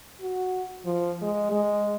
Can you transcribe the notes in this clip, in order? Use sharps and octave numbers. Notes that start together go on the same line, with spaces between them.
F#4
F3
G#3
G#3